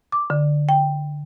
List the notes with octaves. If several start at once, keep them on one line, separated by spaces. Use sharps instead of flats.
D6
D3
G5